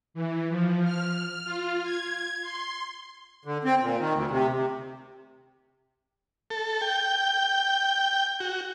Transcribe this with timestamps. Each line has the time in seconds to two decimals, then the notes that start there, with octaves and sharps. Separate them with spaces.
0.14 E3
0.49 F3
0.84 F6
1.45 F4
1.83 G#6
2.42 C6
3.45 D3
3.64 C4
3.80 A#2
3.99 D#3
4.14 D2
4.31 C3
4.56 C3
6.50 A4
6.81 G5
8.40 F#4